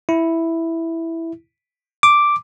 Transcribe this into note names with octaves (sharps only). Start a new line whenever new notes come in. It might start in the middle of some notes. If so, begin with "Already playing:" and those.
E4
D6